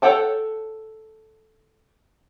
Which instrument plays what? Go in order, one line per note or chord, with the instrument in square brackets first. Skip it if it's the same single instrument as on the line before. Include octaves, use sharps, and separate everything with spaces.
[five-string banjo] A4 C#5 F#5 G5 A5